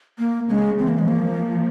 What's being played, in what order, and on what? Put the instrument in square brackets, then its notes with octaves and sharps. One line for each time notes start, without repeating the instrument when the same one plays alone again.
[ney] A#3
[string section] C#3 [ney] G#3
[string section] E3 [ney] C4
[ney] A#3
G#3
[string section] F3 [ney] A#3